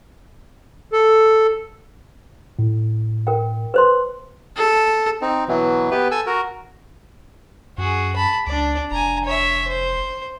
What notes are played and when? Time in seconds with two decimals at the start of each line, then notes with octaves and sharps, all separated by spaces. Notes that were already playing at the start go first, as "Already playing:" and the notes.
0.93 A4
2.59 A2
3.27 A#4 G5
3.74 B4 C5 C6
4.57 A4
5.21 C4 D#4
5.48 B2 E3 F#3
5.91 B3 G4 B4
6.11 A4 G#5 E6
6.26 F#4 A#4
7.78 F#2 F#4 G#4
8.16 A5 B5
8.47 C#2 D4 D5
8.91 F1 G#5 A#5
9.25 C#5 E5
9.67 C5